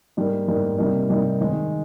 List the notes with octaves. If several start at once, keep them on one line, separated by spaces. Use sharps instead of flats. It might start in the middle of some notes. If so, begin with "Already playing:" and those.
G#2 G3 A#3
G#2 G3 A#3
C3 G3 A#3 D#4
C3 G3 A#3 D#4
D#3 G#3 D#4